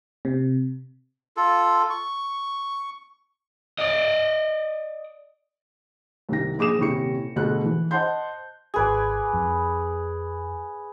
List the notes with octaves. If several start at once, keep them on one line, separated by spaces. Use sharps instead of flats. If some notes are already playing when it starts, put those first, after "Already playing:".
C3
F4 A4
C#6
D5 D#5
C2 D#3 A#6
A#1 G#4 D6 D#6 E7
D#1 C3 E4 C#6 C#7
D2 B2 G#4 A4 F#6
E3
C5 D#5 F#5 A5 C6 G6
G#1 G#4 B4 D5 G#6
F2